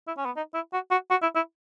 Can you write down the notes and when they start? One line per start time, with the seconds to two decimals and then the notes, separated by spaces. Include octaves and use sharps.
0.08 E4
0.18 C#4
0.26 B3
0.36 D#4
0.54 E4
0.73 F#4
0.91 F#4
1.11 F#4
1.22 E4
1.36 E4